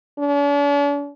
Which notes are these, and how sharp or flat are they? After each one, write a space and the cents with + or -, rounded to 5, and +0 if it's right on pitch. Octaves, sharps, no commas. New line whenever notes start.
D4 -45